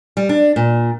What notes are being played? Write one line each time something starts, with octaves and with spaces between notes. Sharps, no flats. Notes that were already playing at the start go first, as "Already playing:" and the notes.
G3
D4
A#2